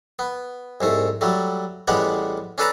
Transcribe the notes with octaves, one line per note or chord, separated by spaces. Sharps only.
B3
C2 G#2 A3
F#3 G3 A3
A1 G3 G#3 B3 G4 F#5
C#4 D4 A4 B4 A5 A#5